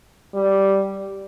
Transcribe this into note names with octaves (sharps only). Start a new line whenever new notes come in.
G3